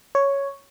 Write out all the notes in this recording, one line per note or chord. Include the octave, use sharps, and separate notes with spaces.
C#5